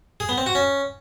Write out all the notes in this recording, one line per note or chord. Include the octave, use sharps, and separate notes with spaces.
G#4
B3
C4
F#4
C#4